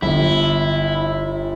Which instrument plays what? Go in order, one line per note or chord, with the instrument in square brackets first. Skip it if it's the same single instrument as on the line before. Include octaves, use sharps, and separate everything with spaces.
[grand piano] G1 [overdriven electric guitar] E4